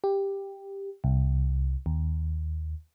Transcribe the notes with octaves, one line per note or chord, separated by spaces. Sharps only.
G4
C2
D#2